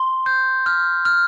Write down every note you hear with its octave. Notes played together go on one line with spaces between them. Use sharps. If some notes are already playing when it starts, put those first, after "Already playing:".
Already playing: C6
G6
F6
F6